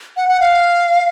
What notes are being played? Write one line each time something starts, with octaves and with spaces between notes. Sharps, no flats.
F#5
F#5
F5